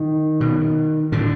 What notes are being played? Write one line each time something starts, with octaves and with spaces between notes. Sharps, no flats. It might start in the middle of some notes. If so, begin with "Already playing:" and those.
Already playing: D#3
B2
A2 D3